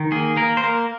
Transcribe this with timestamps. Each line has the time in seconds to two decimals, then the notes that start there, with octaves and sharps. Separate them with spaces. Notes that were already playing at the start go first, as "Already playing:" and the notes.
Already playing: D#3
0.12 A#3 G#4
0.36 A#3 A#4
0.57 C5
0.63 A#3 A#4